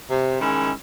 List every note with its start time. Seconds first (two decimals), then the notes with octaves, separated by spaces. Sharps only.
0.11 C3
0.40 D#3 G#3 C#4 E4